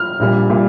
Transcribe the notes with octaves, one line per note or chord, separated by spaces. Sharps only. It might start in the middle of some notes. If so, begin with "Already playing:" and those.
Already playing: F6
A#1 A#2 G3
A#2 G3